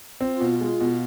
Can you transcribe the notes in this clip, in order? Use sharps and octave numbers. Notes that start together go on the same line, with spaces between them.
C4 F4
B2
G#3
B2